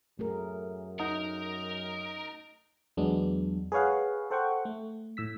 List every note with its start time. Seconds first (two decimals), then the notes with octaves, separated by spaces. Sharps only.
0.19 F#2 A3 G#4 A#4
0.99 D#4 A#4 F#5
2.97 E2 F#3 G#3 B3 D4
3.72 G#4 B4 C#5 F5 F#5
4.31 A4 C5 F#5 G5 C#6
4.65 A3
5.17 A2 E6 B6